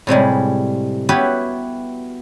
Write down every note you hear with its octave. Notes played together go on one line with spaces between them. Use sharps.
A2 C3 G3 G#3
B3 E4 F#4 G4 B4 C#5